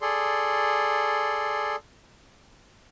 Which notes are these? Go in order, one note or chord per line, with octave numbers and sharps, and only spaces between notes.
G#4 A4 D5 C6